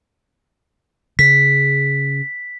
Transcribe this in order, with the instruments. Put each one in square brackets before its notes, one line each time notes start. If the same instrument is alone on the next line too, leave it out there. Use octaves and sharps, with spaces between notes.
[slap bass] C#3 [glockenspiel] B6